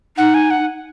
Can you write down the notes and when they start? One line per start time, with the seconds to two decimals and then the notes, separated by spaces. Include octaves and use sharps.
0.17 D#4 F#5
0.34 G#5
0.50 F#5